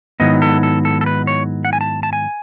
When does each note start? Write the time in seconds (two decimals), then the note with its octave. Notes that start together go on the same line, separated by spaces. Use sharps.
0.20 G#2 D#3 F#3 B3 E4 D#5
0.42 A4
0.63 A4
0.85 A4
1.01 A4
1.06 B4
1.27 C#5
1.65 F#5
1.73 G#5
1.81 A5
2.03 A5
2.13 G#5